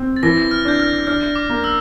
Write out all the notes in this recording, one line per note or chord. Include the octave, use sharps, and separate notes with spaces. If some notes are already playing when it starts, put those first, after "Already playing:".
Already playing: C4
A6
E3 A#6
F6
D4 G6
F6
D4 F6
D6
A#3
E6